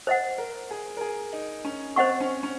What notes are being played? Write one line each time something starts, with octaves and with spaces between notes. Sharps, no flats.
C5 D#5 F#5
A#4
G#4
A#4
G#4
D#4
C#4
C4 C5 D#5 F#5 C#6
C#4
C#4